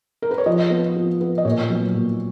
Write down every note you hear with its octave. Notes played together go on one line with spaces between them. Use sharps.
A#4
B4
C#5
F3 D#5
B3
F3
B3
D#5
A#2 C#5
F#3 B3
A#2